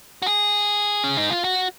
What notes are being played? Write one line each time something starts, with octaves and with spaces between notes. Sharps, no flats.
F#4
G#4
C#4
D#4
F4
F#4